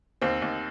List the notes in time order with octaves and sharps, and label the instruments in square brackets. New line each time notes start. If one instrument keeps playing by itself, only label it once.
[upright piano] D#2 C4
D#2